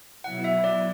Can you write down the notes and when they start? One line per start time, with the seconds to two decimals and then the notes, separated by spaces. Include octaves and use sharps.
0.24 B2 F#3 B3 E4 F#5
0.44 E5
0.64 D5